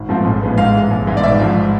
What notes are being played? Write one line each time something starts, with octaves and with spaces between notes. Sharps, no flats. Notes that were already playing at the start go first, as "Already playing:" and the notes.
Already playing: G#1
G#2 F3 A3 C4
A1
A2 F3 G#3 B3
G#2 F5
E3 G#3
A1
G#2 E3 B3
D5
G#1 E5
G#2 F3